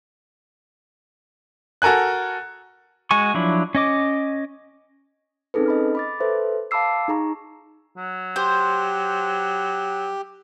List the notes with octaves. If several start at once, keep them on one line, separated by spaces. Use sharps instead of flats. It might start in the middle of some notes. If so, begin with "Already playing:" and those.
F#4 A4 A#4 G#5 F#6
G#3 F#4 G#5 C#6
F3 F#3 D4 E4
C#4 D#5 D6
C4 C#4 D#4 G#4 A4 B4
D#5 B5 F6
B5 D6 A6
A4 B4 C5 E5
F5 A5 B5 D6 E6 C7
D#4 G#4 A#5 C#6
F#3
G4 C5